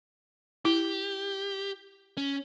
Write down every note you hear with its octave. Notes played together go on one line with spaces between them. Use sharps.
E4 G4
C#4